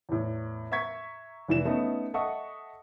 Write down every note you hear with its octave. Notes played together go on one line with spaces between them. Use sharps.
E2 A2
E5 A#5 C#6 G#6 B6
F1 E3 E7
A3 B3 C#4 D#4
A4 D#5 E5 F#5 C#6 D#6